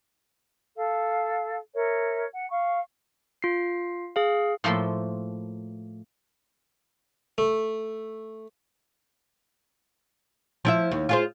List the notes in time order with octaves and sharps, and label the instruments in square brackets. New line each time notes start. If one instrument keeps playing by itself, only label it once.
[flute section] A4 F5
A#4 C#5 E5
F#5
F5 C#6
[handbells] F4 C7
G#4 F5
[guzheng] A2 F3 A#3 A4 C6
[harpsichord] A3
[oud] F3 E4 E5
D#2
F4 G#4 C5